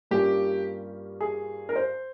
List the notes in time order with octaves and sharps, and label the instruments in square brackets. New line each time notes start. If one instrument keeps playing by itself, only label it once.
[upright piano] G2 G3 A#3 C#4 F4 G4
G#4
A#4
C5